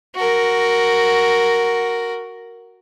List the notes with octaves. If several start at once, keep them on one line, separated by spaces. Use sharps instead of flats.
F#4 A#4